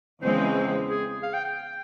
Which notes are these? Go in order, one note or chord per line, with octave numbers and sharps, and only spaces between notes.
E2 C#3 E3 G#3 C4 C5
G#4
F5
G5
G5